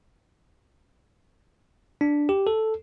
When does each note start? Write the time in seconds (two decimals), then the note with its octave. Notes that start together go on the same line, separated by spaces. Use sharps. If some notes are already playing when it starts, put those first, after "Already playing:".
2.01 D4
2.29 G4
2.47 A4